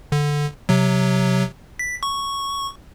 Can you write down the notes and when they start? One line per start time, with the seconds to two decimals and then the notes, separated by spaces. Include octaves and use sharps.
0.12 D3
0.69 C3 F#3
1.79 B6
2.03 C#6